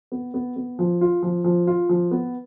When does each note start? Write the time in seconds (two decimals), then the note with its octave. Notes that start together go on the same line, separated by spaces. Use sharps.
0.12 B3
0.34 B3
0.56 B3
0.79 F3
1.01 F4
1.23 F3
1.44 F3
1.67 F4
1.89 F3
2.11 B3